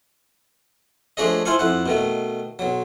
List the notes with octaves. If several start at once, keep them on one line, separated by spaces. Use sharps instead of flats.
F3 A3 D4 G#4 C#5 D#5
E4 F4 C5 F5 G#5 C#6
F2 E4 F#5
B2 D#3 A3
B1 F#3